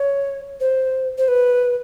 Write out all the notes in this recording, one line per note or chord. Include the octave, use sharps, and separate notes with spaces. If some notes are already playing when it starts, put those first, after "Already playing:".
Already playing: C#5
C5
C5
B4